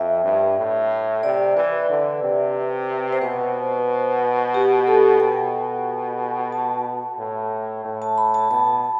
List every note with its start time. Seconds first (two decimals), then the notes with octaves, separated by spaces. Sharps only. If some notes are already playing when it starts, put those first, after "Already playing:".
Already playing: F2 E5
0.24 G2
0.58 A2
1.23 C3 D5
1.56 E3 B4
1.90 D3
2.22 C3
3.13 C5
3.22 B2 B4
4.54 G4
4.87 A4
5.20 B2 G5
6.52 A5
7.19 A2
7.85 A2
8.02 A5
8.18 B5
8.34 A5
8.50 B2 A5